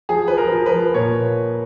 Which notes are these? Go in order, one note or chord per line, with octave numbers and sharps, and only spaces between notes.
F3 G#4
F3 B4
A#4
F3
B4
F3
A#2 C#5